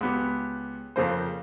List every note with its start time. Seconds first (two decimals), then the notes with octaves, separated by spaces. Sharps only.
0.01 C#2 B3 G4
0.96 F2 C#3 A#3 C5